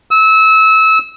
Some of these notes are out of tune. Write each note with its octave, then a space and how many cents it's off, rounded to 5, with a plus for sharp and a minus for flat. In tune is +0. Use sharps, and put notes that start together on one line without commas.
E6 -25